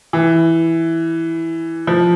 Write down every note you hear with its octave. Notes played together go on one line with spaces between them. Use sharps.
E3
F3